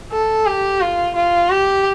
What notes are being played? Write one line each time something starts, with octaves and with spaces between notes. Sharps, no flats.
A4
G4
F4
F4
G4